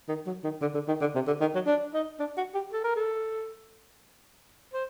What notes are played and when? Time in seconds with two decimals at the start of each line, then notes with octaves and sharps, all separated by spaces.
0.08 D#3
0.26 F#3
0.44 D#3
0.62 D3
0.74 D3
0.88 D#3
1.01 D3
1.15 C3
1.27 D3
1.41 D#3
1.54 F#3
1.67 D4
1.93 D#4
2.19 D4
2.37 F#4
2.54 G4
2.73 A4
2.84 A#4
2.96 A4
4.73 C5